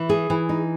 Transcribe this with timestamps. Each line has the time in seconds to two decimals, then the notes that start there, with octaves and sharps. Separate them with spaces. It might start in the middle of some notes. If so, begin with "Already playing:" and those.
Already playing: E3
0.09 G#4
0.30 E3
0.49 D#4